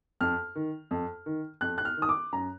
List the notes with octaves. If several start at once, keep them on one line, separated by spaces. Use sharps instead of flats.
F2 F6
D#3
F2
D#3
F2 F#6
F#6
F6
D#3
D#6
D6
F#2 A#5